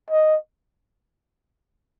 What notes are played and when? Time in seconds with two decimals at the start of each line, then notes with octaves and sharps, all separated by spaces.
0.10 D#5